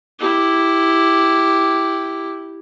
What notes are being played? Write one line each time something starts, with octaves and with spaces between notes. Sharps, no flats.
E4 G4